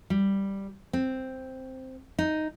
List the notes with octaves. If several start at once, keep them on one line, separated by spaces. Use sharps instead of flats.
G3
C4
D#4